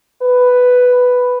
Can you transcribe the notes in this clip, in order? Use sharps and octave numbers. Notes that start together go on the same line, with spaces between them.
B4